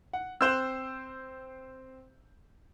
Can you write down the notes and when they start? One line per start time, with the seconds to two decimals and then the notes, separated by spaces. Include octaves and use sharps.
0.13 F#5
0.41 C4 C5 E6 F#6 G6 E7